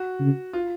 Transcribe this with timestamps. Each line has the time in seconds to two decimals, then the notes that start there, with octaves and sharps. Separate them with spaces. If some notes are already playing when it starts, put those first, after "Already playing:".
Already playing: F#4
0.20 C#3
0.53 F4